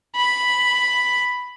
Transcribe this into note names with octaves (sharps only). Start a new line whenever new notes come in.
B5